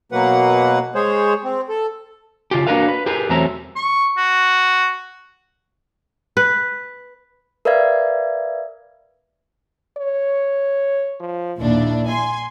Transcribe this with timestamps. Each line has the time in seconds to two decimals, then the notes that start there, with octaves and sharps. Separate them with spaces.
0.12 B2 F#3 A#3 B4 F#5
0.95 G#3 G#4 C5 C#5
1.44 C4
1.69 A4
2.51 C#3 F4 G4
2.67 A#3 D4 F#4 A#4 B4 F5
2.88 B4
3.06 G4 G#4 A#4 B4
3.29 E2 F#3 A3 C4 E4 A#5
3.76 C#6
4.17 F#4
6.37 B4
7.65 A#4 B4 D5 E5 F5 G#6
9.97 C#5
11.20 F3
11.59 A#1 D#2 D4 E4
12.09 G#5 C6